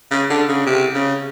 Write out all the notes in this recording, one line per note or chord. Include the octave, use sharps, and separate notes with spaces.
C#3
D3
C#3
C3
C#3